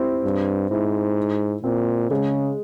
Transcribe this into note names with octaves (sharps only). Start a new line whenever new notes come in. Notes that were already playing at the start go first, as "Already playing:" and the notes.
Already playing: C4 E4 G4
G2
G#2 E4
A#2 C4
C#3 G#3